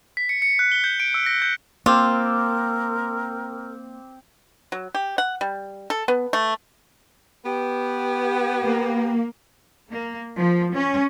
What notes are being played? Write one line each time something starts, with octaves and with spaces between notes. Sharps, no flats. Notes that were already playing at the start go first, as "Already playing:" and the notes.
B6
C#7
C#7
F#6
G7
G6
D7
E6
A#6
G6
A#3 C4 F4 A#4 D6 E6
F#3
G4
F#5
G3
A4
B3
A3
B3 G4
A#3
A#3
F3
C#4